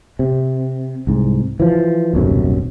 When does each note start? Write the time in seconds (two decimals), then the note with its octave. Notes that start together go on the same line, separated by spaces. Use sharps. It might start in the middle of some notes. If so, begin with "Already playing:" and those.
0.19 C3
1.07 C2 G#2
1.60 E3 F3
2.13 D#1 B1 F#2 C3